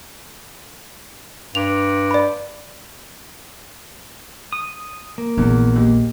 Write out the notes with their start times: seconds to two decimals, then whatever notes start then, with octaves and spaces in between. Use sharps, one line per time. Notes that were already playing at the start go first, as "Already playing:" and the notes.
1.55 G2 F7
2.11 D5 B5
4.53 D#6
5.18 A#3
5.37 A#1 E2
5.76 D#2